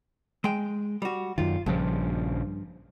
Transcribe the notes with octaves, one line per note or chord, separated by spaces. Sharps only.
G#3 G5
G3 F#4
F#2 D#3 F4
A#1 G2 C#3 F3